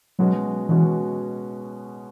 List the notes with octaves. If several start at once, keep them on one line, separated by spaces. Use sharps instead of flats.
B2 F#3 G#3 C#4 F#4
B2 E3 G#3 C#4 F#4